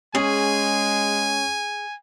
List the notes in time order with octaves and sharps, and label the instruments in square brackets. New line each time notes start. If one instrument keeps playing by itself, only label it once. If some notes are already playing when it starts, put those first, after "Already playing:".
[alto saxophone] G#3 [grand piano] C#4 [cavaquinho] G#4 [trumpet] G#5